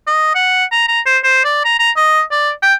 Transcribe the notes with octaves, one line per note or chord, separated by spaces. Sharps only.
D#5
F#5
A#5
A#5
C5
C5
D5
A#5
A#5
D#5
D5
G5